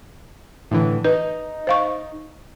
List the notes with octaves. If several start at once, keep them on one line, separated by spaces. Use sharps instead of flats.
A2 D3 E3
D#4 B4
C5 F5 C#6